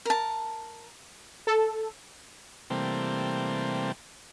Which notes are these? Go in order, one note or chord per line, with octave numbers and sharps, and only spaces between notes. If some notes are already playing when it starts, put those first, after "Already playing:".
A#4 A5
A4
C3 E3 G3 A3 A#3 C4